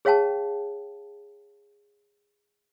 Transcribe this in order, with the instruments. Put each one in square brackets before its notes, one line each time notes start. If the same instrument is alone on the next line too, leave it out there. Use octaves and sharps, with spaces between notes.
[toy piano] G#4 C#5 F5 G5 A5